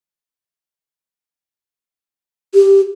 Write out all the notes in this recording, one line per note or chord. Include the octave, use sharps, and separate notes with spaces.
G4